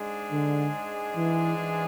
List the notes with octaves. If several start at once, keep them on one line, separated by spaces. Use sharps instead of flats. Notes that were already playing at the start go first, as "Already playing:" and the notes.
Already playing: G#2 G#3 D4 G#4
D3
E3
E3